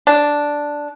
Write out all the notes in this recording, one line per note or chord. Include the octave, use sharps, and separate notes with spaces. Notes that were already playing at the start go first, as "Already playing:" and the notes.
D4